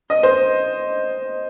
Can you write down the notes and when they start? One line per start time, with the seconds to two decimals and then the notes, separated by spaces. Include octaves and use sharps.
0.10 D#5
0.23 C5